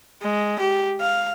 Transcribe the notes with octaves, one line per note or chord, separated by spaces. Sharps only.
G#3
G4
F5